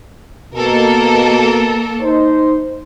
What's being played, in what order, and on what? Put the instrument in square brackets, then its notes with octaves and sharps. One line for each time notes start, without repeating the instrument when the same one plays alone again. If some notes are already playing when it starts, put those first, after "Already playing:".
[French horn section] B2 [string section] A#3 A4 A#4
[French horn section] D#4 C5